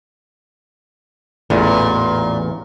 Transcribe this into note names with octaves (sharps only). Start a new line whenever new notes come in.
A1 E2 A#2